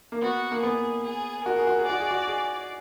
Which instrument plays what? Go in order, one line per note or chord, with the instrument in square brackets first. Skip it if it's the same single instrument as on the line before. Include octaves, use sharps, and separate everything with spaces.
[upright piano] A#3
[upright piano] B3 [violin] F#4
[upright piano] A#3
[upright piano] B3 [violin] G#4
[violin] G#4
[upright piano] F#4 [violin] A#4
[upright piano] G#4
F#4
G#4
[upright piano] F#4 [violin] D5
[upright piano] G#4
F#4
G#4